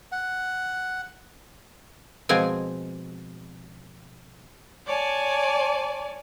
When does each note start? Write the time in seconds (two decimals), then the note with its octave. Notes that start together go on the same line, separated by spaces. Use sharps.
0.12 F#5
2.29 B2 F3 G#3 C4 G#5
4.86 C#5 D5 G#5 A5